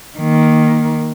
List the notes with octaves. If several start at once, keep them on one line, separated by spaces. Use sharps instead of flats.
D#3 A#3